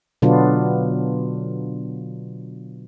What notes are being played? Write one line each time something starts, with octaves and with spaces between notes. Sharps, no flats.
B2 D3 F#3 B3 D4 F4